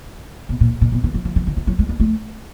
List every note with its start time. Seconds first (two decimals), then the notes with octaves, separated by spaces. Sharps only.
0.49 B2
0.61 A#2
0.81 B2
0.92 B2
1.04 E3
1.14 F#3
1.25 F3
1.36 E3
1.47 D#3
1.57 F3
1.67 F#3
1.79 G#3
1.89 G3
2.00 A3